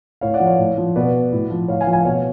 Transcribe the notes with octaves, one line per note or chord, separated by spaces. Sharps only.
A2 C#5 F5
D5 F#5
F3
C#5 F5
A2
F3
B2 B4 D5
A2
F3
A2 C#5 F5
F5 G#5
F3
F5 G#5
B2 C#5 F5